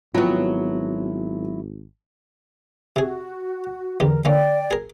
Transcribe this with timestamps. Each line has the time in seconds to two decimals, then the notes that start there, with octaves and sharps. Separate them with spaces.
0.15 G#1 F3 F#3 B3 E4
2.96 C3 F#4 G#4
4.00 E2 D3 G4 A#4
4.25 D3 A#3 C#4 D5 G5
4.71 G#4 A#4